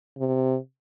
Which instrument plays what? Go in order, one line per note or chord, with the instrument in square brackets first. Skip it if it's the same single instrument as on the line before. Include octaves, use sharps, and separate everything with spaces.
[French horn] C3